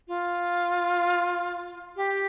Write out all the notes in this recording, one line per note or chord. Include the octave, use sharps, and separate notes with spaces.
F4
G4